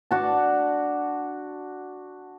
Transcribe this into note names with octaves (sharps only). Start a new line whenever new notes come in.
D4 F#4 A5